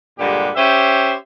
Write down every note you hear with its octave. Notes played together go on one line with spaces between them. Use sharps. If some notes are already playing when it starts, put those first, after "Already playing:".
G2 A#2 D3 G#3 G4
C#4 G4 C5 E5